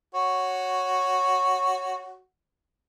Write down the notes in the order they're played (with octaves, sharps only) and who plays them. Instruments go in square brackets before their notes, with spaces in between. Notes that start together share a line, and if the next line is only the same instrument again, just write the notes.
[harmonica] F#4 C#5